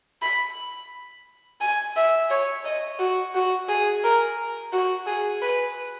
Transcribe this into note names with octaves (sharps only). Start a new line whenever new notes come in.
B5
G#5
E5
C#5
D#5
F#4
F#4
G#4
A#4
F#4
G#4
B4